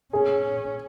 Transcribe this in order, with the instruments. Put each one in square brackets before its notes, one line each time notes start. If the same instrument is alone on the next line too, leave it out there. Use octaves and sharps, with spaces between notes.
[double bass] C#4 [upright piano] G#4